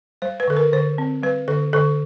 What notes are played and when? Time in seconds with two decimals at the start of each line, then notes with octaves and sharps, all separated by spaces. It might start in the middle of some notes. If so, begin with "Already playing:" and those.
0.22 G3 C5
0.40 B4
0.48 D3 A4
0.57 A#4
0.73 D3 C5
0.98 C4
1.23 G3 B4
1.48 D3 A4
1.73 D3 A4